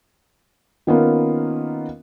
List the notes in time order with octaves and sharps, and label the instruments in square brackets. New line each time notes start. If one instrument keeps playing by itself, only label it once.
[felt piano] D#3 A#3 B3 C#4 F4 A#4